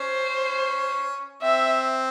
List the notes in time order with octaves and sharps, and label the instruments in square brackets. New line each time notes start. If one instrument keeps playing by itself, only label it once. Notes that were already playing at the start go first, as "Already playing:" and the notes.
Already playing: [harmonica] C#4 [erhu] C5
[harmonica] C4 [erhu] E5